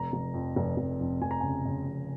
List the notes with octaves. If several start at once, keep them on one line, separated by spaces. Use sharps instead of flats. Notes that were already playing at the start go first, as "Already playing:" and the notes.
Already playing: F1 A#5
F1
F2
F1
F1
F2
F1 G#5
A#5
C#3 G#5
C#3
F2